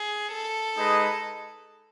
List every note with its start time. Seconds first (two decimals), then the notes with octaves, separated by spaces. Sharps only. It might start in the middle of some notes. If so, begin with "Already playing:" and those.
Already playing: G#4
0.32 A4
0.76 G#3 D#4 G#4 B4 D#5